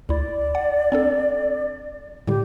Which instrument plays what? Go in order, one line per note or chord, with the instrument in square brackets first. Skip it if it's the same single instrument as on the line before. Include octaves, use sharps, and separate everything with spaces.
[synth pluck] D2 E4 [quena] D5
[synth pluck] F#5
C4 D4 A4
[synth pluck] A2 D3 G3 [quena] G4